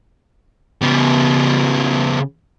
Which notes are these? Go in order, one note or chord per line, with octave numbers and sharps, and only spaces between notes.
C#3 B3